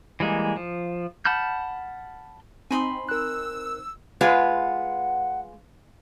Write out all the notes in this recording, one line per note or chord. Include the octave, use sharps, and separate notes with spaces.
E3 G3 G#3 A#3
F3
F#5 A5 B5 F6 G6
C4 D#4 G#5 B5 C6
A#4 E6 F#6
G#3 F4 B4 F#5